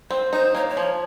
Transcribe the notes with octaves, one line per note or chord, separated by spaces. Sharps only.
C4 C5
D#4 C5
A#3 C#5
C#5
F3